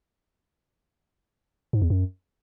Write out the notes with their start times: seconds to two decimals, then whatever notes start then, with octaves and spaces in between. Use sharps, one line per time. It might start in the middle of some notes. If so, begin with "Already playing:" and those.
1.73 G#2
1.82 E2
1.90 F#2